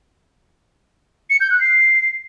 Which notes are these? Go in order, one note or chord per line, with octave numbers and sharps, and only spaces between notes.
C#7
G6
F#6
C7